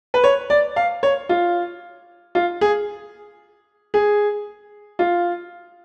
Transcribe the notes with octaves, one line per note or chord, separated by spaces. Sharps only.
B4
C#5
D5
F5
C#5
F4
F4
G#4
G#4
F4